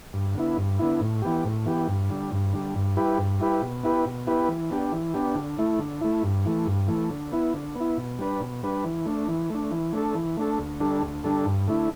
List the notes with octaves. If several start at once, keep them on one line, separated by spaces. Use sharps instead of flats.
G2
D3 B3 E4
G2
D3 B3 E4
A2
E3 B3 G4
A2
E3 B3 G4
G2
D3 G3
G2
D3 G3
G2
G3 E4 G4 B4
G2
G3 E4 G4 B4
B2
B3 E4 G4 B4
B2
B3 E4 G4 B4
E3
B3 D4 G4
E3
B3 D4 G4
D3
A3 E4
D3
A3 E4
G2
E3 A3
G2
E3 A3
D3
B3 E4
D3
B3
E4
B2
G3 D4 B4
B2
G3 D4 B4
E3
A3 D4
E3
A3 D4
E3
A3 D4 A4
E3
A3 D4 A4
D2
D3 G3 D4 A4
D2
D3 G3 D4 A4
G2
D3 A3 E4